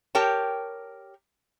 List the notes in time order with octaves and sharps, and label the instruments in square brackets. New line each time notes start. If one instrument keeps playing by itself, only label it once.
[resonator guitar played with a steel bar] G4 A#4 C#5 G5 A5